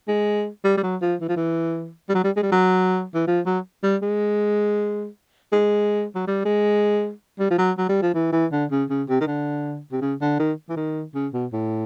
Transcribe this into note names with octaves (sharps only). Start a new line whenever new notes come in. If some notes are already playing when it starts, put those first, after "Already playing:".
G#3
G3
G3
F#3
F3
E3
F3
E3
G3
F#3
G3
G#3
G3
F#3
E3
F3
F#3
G3
G#3
G#3
F#3
G3
G#3
G3
F3
F#3
F#3
G3
F3
E3
E3
D3
C#3
C#3
C3
D#3
D3
C3
C#3
D3
D#3
E3
D#3
C#3
B2
A2